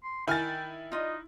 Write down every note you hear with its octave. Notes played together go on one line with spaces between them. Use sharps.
C6
D#3 E4 G5 G#5 F6 A6
D#4 F4 D#5